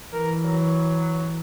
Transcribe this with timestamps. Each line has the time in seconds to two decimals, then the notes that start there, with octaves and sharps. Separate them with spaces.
0.13 E3 A#4
0.45 F#3